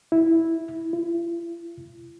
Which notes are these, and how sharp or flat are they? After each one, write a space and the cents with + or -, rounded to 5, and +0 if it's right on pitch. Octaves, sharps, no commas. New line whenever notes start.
E4 -10
E4 +45